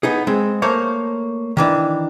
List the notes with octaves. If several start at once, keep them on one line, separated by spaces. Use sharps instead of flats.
B3 D#4 G#4
G#3 C4
A3 A#3 C5 C#5
D#3 E3 D4